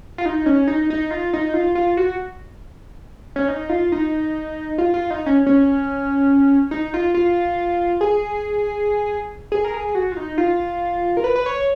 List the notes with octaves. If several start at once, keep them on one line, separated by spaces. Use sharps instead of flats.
F4
D#4
C#4
D#4
D#4
F4
D#4
F4
F4
F#4
C#4
D#4
F4
D#4
F4
F4
D#4
C#4
C#4
D#4
F4
F4
G#4
G#4
A#4
G#4
F#4
F4
D#4
F4
A#4
B4
B4
C#5